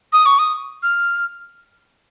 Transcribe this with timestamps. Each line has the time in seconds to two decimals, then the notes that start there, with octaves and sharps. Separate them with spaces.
0.13 D#6
0.26 C#6
0.39 D#6
0.83 F6